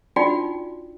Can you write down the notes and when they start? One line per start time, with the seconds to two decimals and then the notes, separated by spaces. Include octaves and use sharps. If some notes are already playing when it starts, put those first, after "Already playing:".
0.16 D4 D#4 F4 F#4 D5 G5